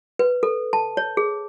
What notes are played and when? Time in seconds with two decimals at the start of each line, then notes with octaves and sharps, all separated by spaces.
0.19 B4
0.43 A4
0.73 A5
0.97 C#5
1.17 G#4